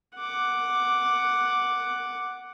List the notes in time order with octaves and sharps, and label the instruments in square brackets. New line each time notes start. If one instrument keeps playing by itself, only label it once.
[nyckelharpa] F#5 D6